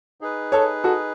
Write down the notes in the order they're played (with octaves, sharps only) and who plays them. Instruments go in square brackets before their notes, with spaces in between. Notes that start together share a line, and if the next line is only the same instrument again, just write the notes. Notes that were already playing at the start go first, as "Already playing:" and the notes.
[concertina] D#4 G#4 B4
[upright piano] A4 C#5
F#4 A4